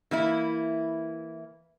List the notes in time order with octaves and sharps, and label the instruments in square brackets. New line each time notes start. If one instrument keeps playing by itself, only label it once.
[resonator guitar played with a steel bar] E3 A#3 E4